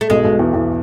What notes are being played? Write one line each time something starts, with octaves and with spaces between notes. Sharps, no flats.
A3
B1 B2 G#3
B1 B2
E2 E3
E2 E3